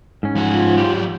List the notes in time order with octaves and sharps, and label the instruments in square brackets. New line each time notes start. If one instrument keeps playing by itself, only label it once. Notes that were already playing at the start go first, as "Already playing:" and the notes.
[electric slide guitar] G#2 C#4
[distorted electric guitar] F3 F#5
[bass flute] F4
[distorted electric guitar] F#3 G4